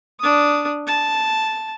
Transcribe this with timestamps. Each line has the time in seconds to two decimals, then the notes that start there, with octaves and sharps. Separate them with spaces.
0.20 D4 D#6
0.87 A5